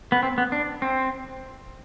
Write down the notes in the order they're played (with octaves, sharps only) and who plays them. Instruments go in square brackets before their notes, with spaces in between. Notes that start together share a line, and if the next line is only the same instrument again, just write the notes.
[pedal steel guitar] B3
C4
B3
D4
C4